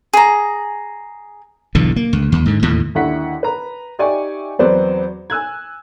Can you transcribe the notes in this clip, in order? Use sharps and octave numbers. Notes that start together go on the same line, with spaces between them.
G#4 A#5
B1 E2 G2 D3
A#3
C#2
D#2
G#2 D3
D#2 A2 D3
D#2 D3 E4 F#5 C#6 B6
B4 A#5
D#4 G4 D5 E5 G#5 C#6
E2 F#3 B3 C4 C5 D5
G#5 E6 F#6 G#6